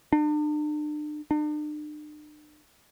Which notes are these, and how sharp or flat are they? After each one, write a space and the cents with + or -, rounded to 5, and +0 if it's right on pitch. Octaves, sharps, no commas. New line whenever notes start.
D4 +40
D4 +45